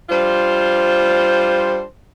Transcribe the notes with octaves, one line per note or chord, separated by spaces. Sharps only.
G3 D4 F4 C5